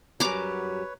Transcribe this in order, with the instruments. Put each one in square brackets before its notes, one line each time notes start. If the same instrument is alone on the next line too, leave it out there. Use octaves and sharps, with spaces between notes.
[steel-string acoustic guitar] F#2 F#3 G3 [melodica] B4 C#5 [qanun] A#5 D6